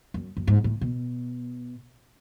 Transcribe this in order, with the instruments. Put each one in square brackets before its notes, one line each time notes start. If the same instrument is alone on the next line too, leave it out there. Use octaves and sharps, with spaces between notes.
[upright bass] F#2
F#2
G#2
A2
B2